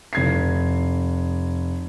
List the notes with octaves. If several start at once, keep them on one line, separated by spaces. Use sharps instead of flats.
F1 G#6 C7